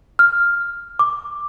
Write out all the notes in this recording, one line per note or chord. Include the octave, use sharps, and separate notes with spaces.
F6
D6